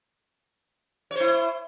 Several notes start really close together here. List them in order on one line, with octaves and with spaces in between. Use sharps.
C#5 C5 E4